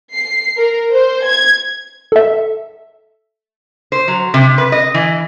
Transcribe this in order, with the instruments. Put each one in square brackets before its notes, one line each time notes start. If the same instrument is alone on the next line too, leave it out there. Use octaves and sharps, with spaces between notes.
[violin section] C7
A#4
C5
G#6
[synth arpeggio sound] A4 E5
[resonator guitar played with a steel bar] C5
F#3
C3
B4
D#5
E3